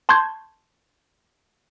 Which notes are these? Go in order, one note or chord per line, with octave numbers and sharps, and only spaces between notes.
A5 C6 C#6 G6 G#6